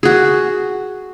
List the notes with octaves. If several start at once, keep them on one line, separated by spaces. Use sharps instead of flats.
F#4 G#4